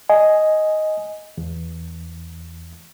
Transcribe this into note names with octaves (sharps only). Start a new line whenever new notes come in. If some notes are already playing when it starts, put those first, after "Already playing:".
D#5 G#5
E2